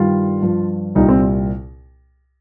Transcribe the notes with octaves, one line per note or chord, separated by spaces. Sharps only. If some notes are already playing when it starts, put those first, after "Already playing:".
Already playing: G2 D#3 G3 F4
G2 F3
C2 A#2 G3 D#4
C4